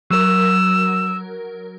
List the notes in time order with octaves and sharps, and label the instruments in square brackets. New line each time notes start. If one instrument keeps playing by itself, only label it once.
[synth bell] F#3 A#4 [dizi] E6